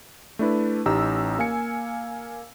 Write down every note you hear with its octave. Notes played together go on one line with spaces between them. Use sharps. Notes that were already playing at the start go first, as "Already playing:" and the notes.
A3 D4 E4 B4
A1 D#4 G4 A#5 E6
A#3 F5 G#5 C#7